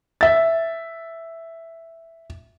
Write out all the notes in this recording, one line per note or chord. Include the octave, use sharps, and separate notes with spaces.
E5 A6